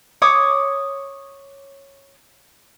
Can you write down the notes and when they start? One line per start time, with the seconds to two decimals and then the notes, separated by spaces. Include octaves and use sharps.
0.22 C#5 D6 D#6